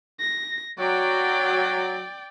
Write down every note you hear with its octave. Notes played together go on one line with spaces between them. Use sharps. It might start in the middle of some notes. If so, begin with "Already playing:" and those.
A#6
F#3 D5 G5